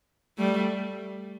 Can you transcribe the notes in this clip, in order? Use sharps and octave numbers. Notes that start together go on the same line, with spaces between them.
G3 A3